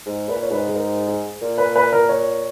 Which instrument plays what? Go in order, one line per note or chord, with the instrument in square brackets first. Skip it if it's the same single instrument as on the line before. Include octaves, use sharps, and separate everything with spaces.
[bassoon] G#2
[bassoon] A#2 [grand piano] B4
[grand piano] C#5
[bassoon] G#2 [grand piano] B4
[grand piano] G#4
A#4
G#4
[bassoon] A#2
[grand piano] B4
B4
A#4
C#5